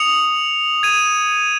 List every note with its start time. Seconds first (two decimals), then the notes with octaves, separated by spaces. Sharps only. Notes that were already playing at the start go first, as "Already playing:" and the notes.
Already playing: D#6 C#7 F7
0.83 G#6 D#7